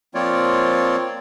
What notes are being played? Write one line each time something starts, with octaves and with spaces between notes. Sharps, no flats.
F3 A#3 C4 F4 C#5 D5